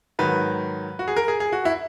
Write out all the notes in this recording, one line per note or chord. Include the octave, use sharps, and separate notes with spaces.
G#2 D#3 F#3 B4
F#4
G#4
A#4
G#4
G#4
F#4
E4